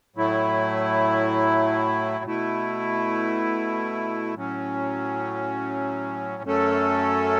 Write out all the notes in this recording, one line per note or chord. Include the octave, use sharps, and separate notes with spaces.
A2 F#3 A3 E4
B2 A3 E4
A2 F#3 C#4
F#2 F#3 A3 C#4 A4